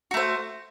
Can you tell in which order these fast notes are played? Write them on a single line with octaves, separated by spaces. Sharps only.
F#4 A3 C5